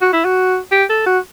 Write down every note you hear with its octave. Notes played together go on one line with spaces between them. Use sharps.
F#4
E4
F#4
G4
A4
F#4